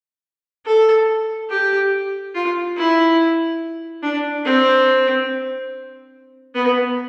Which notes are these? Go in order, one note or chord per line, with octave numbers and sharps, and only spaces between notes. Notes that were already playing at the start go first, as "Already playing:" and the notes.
A4
G4
F4
E4
D4
C4
B3